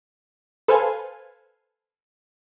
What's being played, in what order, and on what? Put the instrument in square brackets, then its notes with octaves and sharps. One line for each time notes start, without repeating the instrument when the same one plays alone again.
[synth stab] A4 B4 C5 F5 G#5